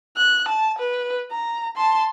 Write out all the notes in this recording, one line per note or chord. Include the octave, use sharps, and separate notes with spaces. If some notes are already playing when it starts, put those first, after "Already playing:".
F#6
A5
B4
A#5
A5 C6